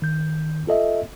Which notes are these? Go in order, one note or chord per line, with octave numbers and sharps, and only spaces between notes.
D#3 G6
F4 A4 D#5 E5